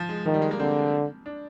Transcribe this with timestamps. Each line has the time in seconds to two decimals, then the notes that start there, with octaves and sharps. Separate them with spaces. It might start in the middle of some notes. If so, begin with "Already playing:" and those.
Already playing: F3
0.09 G#3
0.26 D#3 F3
0.34 G3
0.42 G#3
0.51 A#3
0.59 D3 C4
1.26 D4